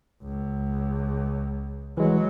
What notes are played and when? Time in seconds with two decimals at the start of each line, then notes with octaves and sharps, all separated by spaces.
0.23 C#2
1.97 E3 F#3 G#3